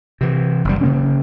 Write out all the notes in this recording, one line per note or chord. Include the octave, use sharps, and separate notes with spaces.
C3 E3
F#1 G3
C#3 A#3 C#4